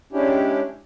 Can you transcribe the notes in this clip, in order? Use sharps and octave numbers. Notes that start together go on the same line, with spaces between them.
G#3 C#4 D4 E4 G4